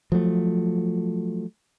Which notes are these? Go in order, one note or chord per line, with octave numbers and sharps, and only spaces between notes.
F3 F#3 A3